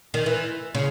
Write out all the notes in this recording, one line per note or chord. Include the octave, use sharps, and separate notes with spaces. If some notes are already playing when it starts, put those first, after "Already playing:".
D#3
E3
C#3